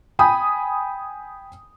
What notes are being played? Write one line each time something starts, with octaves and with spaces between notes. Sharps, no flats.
G5 G#5 B5 D#6